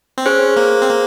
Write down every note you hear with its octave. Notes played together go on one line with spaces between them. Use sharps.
C4
C#4 G#4 C5
A#3
C4
A#3